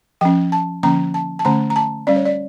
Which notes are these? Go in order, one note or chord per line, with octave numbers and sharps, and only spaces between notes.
F3 C#4 G5
A5
D3 F3 A#3 C#4 A#5
A5
A5
D3 A3 C#4 A#5
A#5
A5
G3 C#4 D5
C#5
D5